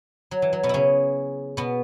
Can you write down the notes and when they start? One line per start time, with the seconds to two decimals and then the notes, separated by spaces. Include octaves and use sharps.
0.31 F#3
0.42 E3
0.53 F#3
0.63 B2 B3
0.69 C#3 C#4 E4
1.57 B2 B3